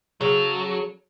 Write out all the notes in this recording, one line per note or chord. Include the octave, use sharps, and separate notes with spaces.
C#3 F#3 A4